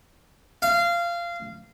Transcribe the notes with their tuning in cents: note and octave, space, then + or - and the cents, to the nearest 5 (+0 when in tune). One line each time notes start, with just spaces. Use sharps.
F5 -20